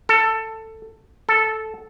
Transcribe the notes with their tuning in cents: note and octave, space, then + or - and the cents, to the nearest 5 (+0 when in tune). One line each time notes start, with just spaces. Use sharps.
A4 +15
A4 -5